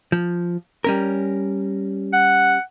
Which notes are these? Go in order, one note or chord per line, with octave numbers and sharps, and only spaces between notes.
F3
G3 C#4 A#4
F#5